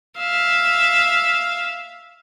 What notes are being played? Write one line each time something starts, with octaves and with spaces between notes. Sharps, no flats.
E5 F5